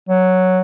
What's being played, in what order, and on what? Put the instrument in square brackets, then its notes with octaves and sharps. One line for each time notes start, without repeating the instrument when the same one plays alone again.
[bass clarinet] F#3